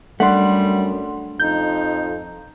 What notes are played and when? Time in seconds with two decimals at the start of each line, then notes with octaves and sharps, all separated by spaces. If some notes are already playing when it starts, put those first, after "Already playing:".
0.20 F#2 G3 A3 D4 F#5 C6
1.40 F2 D#4 G6